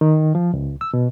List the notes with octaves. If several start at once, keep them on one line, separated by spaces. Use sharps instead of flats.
D#3
F3
C#2
E6
B2